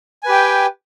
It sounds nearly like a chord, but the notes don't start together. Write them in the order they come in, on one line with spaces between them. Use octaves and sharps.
G#5 B4 G4 G5